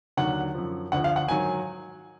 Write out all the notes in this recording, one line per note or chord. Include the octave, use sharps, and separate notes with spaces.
D#2 D3 F#3 F#5
F#2 F3
D2 D3 F3 F#5
F5
F#5
G#2 D#3 F#3 G#5